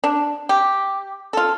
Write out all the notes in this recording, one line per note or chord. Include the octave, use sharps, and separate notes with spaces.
D4
G4
F4 A4